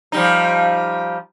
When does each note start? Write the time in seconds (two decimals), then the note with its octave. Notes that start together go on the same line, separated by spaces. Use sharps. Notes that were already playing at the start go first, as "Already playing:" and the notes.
0.12 F3 G3 D#4